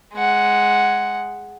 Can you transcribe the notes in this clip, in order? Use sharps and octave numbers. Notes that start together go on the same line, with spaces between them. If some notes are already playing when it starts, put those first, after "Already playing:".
G#3 F#5